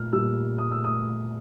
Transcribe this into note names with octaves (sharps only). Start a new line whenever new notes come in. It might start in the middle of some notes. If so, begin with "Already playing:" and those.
Already playing: A#2 F6
A#2 G3 E6
D#6
E6
D#6